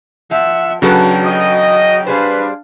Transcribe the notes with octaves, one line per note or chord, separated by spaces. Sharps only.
F3 E5 F#5
C#3 F#3 D4 F#4 A4 B4 G5
D#5
G3 D4 G#4 B4 C5 F5